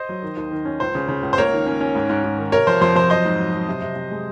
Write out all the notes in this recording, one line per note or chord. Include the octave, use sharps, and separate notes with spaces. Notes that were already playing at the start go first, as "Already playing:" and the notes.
Already playing: C5 D#5
F#3
D#3
D#2
D#3
C#4
C#2 C5
C#3
C#3
C#2
C5
A#3 A#4 C#5
D#3
C#4
C#4
G#2
G#2
G#2
D#3
C3 A#4 C#5
F3 C5
F2 C5
F2 C5
F#3 C5 D#5
G#2
F#3
F#3
C3
C3
C3
G#3